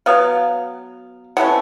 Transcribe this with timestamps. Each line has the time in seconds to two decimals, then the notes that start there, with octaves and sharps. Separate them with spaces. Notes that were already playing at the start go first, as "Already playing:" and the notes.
0.06 F#3 B3 F5
1.37 C3 E3 A3 C#4 F#5